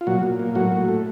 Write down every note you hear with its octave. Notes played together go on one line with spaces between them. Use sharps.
F4
A#2 F#3 F#4
A#2
A#3
A2 F#3 F#4
A2
A3